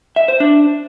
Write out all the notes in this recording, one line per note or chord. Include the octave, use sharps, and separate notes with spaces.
E5
C5
D4